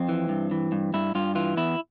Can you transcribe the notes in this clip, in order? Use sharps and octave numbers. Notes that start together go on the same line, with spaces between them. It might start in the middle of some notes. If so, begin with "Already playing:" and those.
Already playing: F2 C4
E3
G2
E3
G2
G2 E4
G2 F4
E3 F4
E2 E4